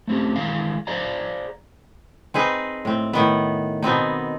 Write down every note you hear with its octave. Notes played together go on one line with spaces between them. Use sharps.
A3 C4 C#4 G4
D#3 E3 G#3 G#4 F5
G#4 C5 D5 F5 A#5
C4 D#4 G#4 B4
A2 C4
A2 D#3 B3
B2 B3 C4 D#4